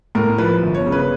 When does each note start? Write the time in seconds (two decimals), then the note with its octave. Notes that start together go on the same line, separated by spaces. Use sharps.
0.15 A2 A#4
0.38 F3 B4
0.63 G1
0.74 C#5
0.87 C#3
0.92 B4